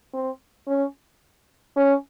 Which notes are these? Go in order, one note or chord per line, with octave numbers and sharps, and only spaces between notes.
C4
C#4
C#4